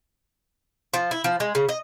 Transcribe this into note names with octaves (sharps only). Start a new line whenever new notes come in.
F3
E4
F3
G#3
C#3
D#5